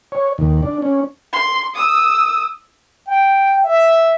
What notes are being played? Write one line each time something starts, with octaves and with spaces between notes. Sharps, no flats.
C#5
D#2
D4
C#4
C6
D#6 E6
G5
E5